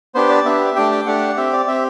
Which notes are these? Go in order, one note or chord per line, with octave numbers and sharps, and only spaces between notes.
B3 D4 G4 C5
D5
B3 D4 G4 E5
A3 D4 G4 G5
G5
A3 D4 G4 F#5
D5
C4 G4 E5
D5
C4 G4 E5